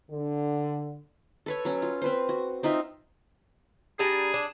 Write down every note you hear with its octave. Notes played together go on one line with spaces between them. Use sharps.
D3
A4 B4 C#5
F#3 C#4
F4
C4 B4 C5
F#4
C4 D#4 F4 E5
G3 D4 G#4 A#5
D4